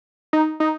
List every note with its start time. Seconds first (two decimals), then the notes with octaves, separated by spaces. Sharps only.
0.33 D#4
0.60 D#4